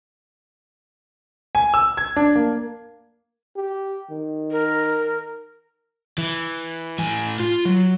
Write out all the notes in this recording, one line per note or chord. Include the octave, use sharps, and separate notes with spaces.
G#5
E6
G#6
D4
A#3
G4
D#3
A#4
E3
A2 G#5
F4
F#3